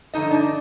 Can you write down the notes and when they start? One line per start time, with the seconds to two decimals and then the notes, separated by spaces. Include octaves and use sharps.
0.14 G2 D3 F3 A3 D#4 D#5
0.31 D4 D5